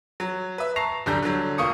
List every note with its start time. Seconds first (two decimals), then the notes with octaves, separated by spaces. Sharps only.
0.20 F#3
0.58 B4 E5
0.76 A5 A#5 C#6 A#6 C7 F7
1.06 D1 D3 G3 A#5 G6
1.23 D3 F#3
1.58 E1 A#3 F4 C#6 D#6 C#7